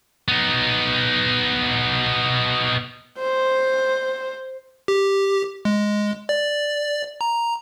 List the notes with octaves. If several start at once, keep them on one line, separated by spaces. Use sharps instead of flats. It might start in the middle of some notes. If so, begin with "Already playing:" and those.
B3 D#4
C5
G4
G#3
D5
A#5